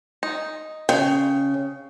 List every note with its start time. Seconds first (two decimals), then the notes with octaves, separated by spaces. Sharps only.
0.23 D#4
0.89 C#3 G5